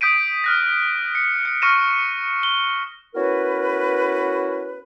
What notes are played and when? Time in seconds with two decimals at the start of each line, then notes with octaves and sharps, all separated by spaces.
0.01 D#6 G6 B6 D7 D#7
0.44 F6 F#6 A#6
1.15 C#7
1.45 C#7
1.62 C#6 F6 A#6 C#7 D#7 E7
2.43 G7
3.15 B3 C#4 E4 F#4 A#4 B4